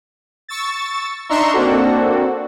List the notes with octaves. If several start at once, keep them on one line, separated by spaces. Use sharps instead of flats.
C#6 E6 A6
D4 D#4 E5 A#5 C6 C#6
A#3 C4 D4 F#4 A4